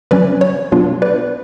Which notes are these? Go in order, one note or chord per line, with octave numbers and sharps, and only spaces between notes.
C#3 F#3 C#4 B4 D5
C#5
B2 F#3 B3 D4 F4
B4 D5